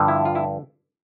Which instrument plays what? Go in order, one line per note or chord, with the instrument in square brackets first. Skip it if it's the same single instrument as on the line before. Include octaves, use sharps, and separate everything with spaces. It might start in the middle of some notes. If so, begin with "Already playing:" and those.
Already playing: [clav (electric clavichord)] G2 D3 F3
E4
F4
E4